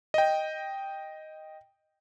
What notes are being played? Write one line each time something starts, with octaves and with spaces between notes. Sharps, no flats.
D#5 G5